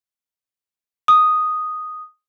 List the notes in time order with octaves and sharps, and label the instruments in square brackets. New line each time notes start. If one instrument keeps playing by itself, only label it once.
[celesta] D#6